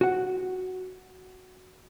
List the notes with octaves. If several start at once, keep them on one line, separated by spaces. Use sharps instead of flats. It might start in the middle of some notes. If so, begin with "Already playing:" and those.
F#4 F#5